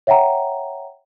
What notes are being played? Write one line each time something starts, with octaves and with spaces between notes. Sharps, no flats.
C#5 E5 F#5 G5 A#5